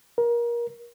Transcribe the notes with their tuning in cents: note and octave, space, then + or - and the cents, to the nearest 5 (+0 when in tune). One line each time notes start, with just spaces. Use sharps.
A#4 +25